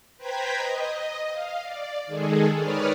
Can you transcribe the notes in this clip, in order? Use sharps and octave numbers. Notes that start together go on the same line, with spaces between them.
B4 C5 G5 A#5 G#6 B6
D#5
F5
D5
D#3 G#3 G#4 A4
D#3 B4 C#5 D5 D#6 F6